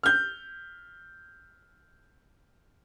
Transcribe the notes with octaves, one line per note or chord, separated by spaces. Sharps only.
F6 G6